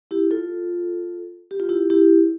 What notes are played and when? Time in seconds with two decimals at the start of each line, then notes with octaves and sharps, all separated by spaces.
0.11 E4 G4
0.31 F4 A4
1.51 G4
1.60 F4
1.69 E4 G4
1.90 E4 G4